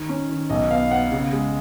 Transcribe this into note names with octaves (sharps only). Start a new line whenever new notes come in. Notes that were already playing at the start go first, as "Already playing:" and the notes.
Already playing: D#3
C#4
D#3
B1 D#5
B3 F5
B3 F#5
C#3
G#3